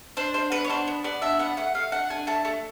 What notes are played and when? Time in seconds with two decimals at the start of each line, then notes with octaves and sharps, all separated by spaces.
0.17 D4 C5
0.34 D4 C5
0.52 B3 B4
0.64 C#5
0.70 D4 C5
0.87 B3
1.04 B3 D5
1.22 D4 E5
1.39 B3 F#5
1.57 A3 F#5
1.75 A3 F5
1.92 D4 F#5
2.10 D4 G#5
2.27 A3 A5
2.45 A3